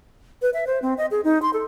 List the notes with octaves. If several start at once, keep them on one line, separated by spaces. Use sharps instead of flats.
B4
E5
C5
C4
D#5
G#4
D#4
C6
A4